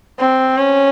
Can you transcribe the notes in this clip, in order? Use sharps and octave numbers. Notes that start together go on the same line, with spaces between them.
C4
C#4